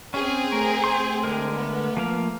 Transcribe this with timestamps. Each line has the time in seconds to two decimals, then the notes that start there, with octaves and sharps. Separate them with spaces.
0.14 C4 C#4 G#4
0.52 A3 A#4
0.84 C5 C6
1.23 D3 G#3 A#4
1.54 B3
1.97 F3 A#3 F5